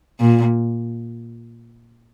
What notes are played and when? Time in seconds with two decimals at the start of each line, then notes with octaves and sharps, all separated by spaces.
0.20 A#2